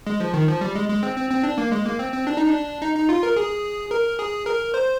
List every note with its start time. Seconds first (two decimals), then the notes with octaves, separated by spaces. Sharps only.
0.07 G#3
0.20 F3
0.34 D#3
0.48 F3
0.61 G3
0.75 G#3
0.89 G#3
1.03 C4
1.16 C4
1.31 C4
1.44 D4
1.58 A#3
1.72 G#3
1.85 A#3
1.99 C4
2.13 C4
2.27 D4
2.37 D#4
2.47 D4
2.82 D#4
2.95 D#4
3.09 F4
3.23 A#4
3.37 G#4
3.91 A#4
4.19 G#4
4.46 A#4
4.74 C5